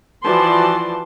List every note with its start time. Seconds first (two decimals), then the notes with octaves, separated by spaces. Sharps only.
0.24 E3 F3 F#4 D5 A5 C6